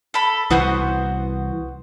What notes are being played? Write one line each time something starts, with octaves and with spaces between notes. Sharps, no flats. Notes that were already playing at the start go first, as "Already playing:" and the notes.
A4 B5
C2 E3 B3 F#4 C5